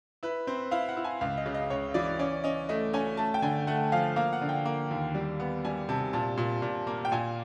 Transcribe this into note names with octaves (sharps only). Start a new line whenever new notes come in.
E4 B4
C4 C5
E4 F5
F#5
E4
G#5
C#2 F5
D#5
C#3
D#5
C#2 C#5
E3 D5
C#4 D5
C#4 D#5
A3 D#5
C#4 G#5
A3 A5
G5
D3 G#5
A3 F#5
F3 F5
A#3 F5
F#5
D3
G5
A#3
D#2
G3
B3
G3 G#5
C3 A5
A#2 A5
A#2
A#2
A#3
G5
A#2 G#5